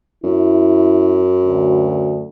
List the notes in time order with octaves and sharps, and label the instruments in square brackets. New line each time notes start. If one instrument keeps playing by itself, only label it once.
[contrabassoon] F#2 [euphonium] E4
[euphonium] D2